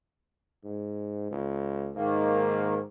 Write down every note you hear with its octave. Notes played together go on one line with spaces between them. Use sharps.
G#2
C#2
G#2 D#3 A#3